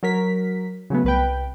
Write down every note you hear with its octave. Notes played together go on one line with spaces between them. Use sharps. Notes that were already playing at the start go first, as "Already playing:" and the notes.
F#3 A#4 B6
C#3 F#3 A3 B3
C2 B4 G5